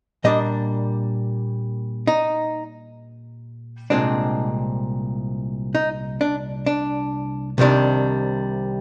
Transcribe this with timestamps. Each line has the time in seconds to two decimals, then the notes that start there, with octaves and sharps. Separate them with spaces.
0.24 A#2 G3 A#3 D4 D#5
2.07 D#4
3.90 C2 A#2 G#3 C4 D4
5.75 D#4
6.21 D4
6.66 D4
7.58 C2 C3 D#3 G3 D4